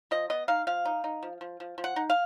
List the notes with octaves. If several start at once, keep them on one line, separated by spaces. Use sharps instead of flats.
F3 D#5
B3 D#5
D#4 F5
F3 F5
D#4
D#4
F3
F3
F3
F3
F#5
D#4
F5